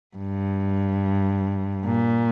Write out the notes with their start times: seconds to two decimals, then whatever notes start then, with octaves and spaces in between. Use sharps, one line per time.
0.17 G2
1.86 A#2